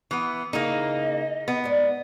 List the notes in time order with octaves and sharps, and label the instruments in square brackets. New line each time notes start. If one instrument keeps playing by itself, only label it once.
[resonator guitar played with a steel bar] E3 B3
[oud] C#3 E4 G#4 [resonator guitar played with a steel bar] A#3 D#4 [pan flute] D#5
[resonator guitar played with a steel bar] B3
[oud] G#2 D5